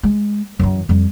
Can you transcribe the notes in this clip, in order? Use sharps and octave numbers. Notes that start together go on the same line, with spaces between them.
G#3
F#2 E3
F2 G3